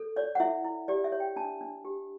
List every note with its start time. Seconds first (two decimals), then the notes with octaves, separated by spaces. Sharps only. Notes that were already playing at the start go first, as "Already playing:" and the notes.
Already playing: A4
0.16 C#5 D5
0.35 F#5
0.40 E4 E5
0.65 E4
0.88 G4 D5
1.04 E5
1.12 C#5
1.20 G5
1.36 D4 A5
1.61 D4
1.85 G4